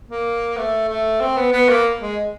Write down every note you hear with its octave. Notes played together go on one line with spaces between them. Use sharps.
A#3
A3
A3
C4
B3
B3
A#3
G#3